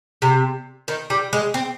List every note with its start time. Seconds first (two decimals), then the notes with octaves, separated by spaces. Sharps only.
0.22 C3
0.88 D#3
1.10 G3
1.33 G#3
1.54 C4